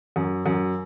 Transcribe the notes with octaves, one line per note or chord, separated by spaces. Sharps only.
F#2
F#2